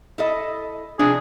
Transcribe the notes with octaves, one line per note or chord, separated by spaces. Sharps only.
E4 A4 D#5
C3 F3 D4 G#4